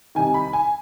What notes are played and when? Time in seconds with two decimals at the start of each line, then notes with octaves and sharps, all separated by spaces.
0.15 C2 C3 D#3 G#5
0.34 B5
0.53 G#5